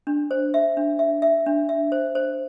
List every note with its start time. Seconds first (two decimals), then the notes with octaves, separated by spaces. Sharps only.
0.07 D4
0.31 C5
0.54 E5
0.77 D4
0.99 E5
1.22 E5
1.46 D4
1.69 E5
1.92 C5
2.15 C5